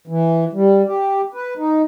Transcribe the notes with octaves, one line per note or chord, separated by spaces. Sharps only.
E3
G3
G4
B4
D#4